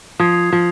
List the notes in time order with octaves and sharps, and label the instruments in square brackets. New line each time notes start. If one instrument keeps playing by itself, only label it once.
[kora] F3 [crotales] D#6 G#6 C7
[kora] F3